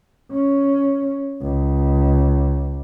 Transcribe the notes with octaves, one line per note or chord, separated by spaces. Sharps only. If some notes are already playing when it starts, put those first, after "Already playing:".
C#4
C#2